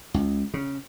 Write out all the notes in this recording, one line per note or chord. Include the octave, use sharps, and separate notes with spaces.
C#2
C#3